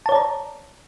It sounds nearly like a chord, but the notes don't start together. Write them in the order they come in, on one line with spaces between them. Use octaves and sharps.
A5 C#5 D5 A#5